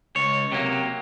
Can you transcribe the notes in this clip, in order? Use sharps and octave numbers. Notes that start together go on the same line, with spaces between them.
C#2 C#5
C3 F#3 A#3